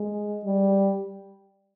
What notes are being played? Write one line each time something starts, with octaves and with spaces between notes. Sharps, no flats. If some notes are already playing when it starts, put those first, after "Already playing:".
Already playing: G#3
G3